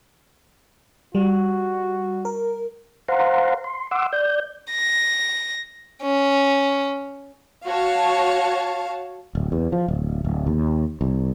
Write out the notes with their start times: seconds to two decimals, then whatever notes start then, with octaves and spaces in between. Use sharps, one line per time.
1.15 G3 F#4
2.25 A#4
3.08 C5 F5 F#5 A#5 C6
3.64 C6
3.91 F#5 C6 D6 E6
4.13 D5 G6
4.71 A#6
6.02 C#4
7.66 F#4 C#5 F5 A5
9.35 D1
9.52 E2
9.72 F3
9.88 D1
10.25 D1
10.47 D#2
11.01 C2